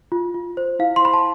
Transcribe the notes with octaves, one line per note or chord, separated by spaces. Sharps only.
F4
F4
C5
E4 F5
C6
C5 B5
A5